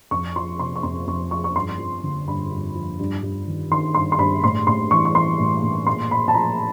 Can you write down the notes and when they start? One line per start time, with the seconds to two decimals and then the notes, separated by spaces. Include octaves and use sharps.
0.11 F2 C#6
0.36 F3 C6
0.59 C3 C6
0.76 C#6
0.83 F2 C6
1.07 F2 C#6
1.31 F3 C#6
1.44 C#6
1.56 G2 C6
1.79 F3
2.03 D3
2.28 G2 B5
2.51 G2
2.75 F3
2.99 G2
3.23 G2
3.47 D#3
3.71 D#3 C6
3.95 G2 C6
4.12 C6
4.19 G2 B5
4.43 A2 C6
4.67 A2 C6
4.91 E3 C#6
5.05 C#6
5.14 E3 C6
5.40 A2
5.63 A2
5.87 A#2 C6
6.11 A#2 B5
6.28 A5
6.34 F3 A#5